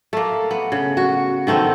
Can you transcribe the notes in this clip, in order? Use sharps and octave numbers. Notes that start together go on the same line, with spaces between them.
A3 A#3
B3
C#3
F#4
D#3 A3 B3 C4